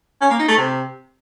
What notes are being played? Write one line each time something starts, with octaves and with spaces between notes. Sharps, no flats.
C#4
A#3
D#4
A3
C3